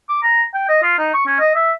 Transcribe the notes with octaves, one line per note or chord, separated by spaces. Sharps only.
D6
A#5
G5
D#5
F4
D#4
C#6
C#4
D#5
E5